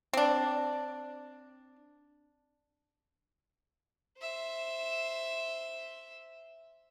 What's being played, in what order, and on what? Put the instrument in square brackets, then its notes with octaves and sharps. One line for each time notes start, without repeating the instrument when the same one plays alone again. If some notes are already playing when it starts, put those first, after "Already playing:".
[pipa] C4 D4
[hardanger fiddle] C5 E5